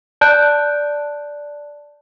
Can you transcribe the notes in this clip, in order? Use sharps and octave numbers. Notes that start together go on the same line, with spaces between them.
D5 A5 F#6 G6